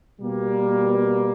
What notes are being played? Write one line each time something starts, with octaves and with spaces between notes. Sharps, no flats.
B2 G3 A#3